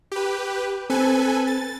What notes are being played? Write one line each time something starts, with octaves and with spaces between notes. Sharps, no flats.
G4 B4
C4 A4 B4 G#5
A6